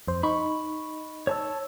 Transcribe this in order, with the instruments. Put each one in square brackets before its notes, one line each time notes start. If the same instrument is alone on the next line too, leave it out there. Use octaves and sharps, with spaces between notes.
[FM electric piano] F2 C5
[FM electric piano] D#4 [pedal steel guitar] B5 C#6
[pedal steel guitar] C#5 A5 E6